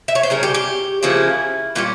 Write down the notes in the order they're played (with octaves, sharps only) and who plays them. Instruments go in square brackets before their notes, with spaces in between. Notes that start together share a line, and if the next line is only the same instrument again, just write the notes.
[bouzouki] E5
C#5
C5
C#3 G3 C#4 A#4
G4
G4
C#3 F3 A#3 C#4 E4
A#2 G3 C#4 F4